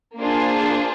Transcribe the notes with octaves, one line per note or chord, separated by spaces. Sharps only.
A#3 D4 F4 G#4 C5